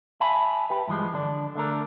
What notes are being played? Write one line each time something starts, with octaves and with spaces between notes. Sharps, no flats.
E5 G#5 A5 B5
G4 B4
G2 E3 F3 G#3
D3 D4
D3 A3 D4 A#4